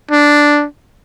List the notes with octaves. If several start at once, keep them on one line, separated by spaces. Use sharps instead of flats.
D4